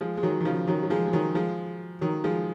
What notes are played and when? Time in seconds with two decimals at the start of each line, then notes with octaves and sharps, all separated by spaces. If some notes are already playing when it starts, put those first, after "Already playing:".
0.01 F3 G#3
0.17 G#3
0.23 D#3 F#3
0.41 D#3
0.45 C#3 F3
0.67 D#3 F#3
0.83 F#3
0.90 F3 G#3
1.07 G#3
1.13 D#3 F#3
1.35 F3 G#3
2.01 D#3 F#3
2.24 F3 G#3